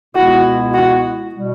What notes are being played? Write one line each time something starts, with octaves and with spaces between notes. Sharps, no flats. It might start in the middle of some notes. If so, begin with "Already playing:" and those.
C#2 B2 G#3 B3 E4 F#4
F#4
B2 G3